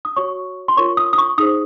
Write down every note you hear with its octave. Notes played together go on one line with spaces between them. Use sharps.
D#6
F#4 C#5 C#6
C6
F4 A#4 C#5 C#6
D#6
D#6
C#6
D#4 G#4 C5 D#6